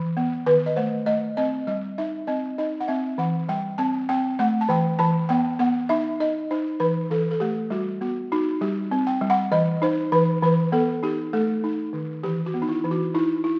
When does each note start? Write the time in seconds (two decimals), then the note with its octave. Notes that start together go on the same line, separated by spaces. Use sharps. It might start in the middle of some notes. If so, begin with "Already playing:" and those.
Already playing: E3
0.17 B3
0.46 D#3 B4
0.66 D#5
0.76 A3 C5
1.06 A3 D#5
1.37 C4 D#5
1.67 G3 D#5
1.98 D#4 E5
2.27 C4 D#5
2.58 D#4 D#5
2.80 F#5
2.88 C4 E5
3.18 E3 F#5
3.49 G3 G5
3.78 C4 A5
4.09 C4 G5
4.39 A3 F#5
4.61 A5
4.69 E3 G5
4.99 E3 A5
5.29 B3 G5
5.59 B3 F#5
5.89 D#4 E5
6.20 D#4 D#5
6.51 D#4 C5
6.80 E3 B4
7.11 E3 A4
7.31 A4
7.40 A3 G4
7.70 G3 F#4
8.01 B3 F#4
8.32 D#4 F#4
8.61 G3 G4
8.91 C4
9.07 G5
9.21 G3
9.30 F#5
9.52 E3 D#5
9.82 D#4 C5
10.12 E3 B4
10.42 E3 B4
10.72 B3 A4
11.03 D#4 G4
11.33 A3 A4
11.64 D#4
11.93 D#3
12.23 E3 G4
12.46 F#4
12.54 B3
12.62 D#4
12.69 E4
12.85 E3
12.91 F#4
13.15 D#4 E4
13.44 E4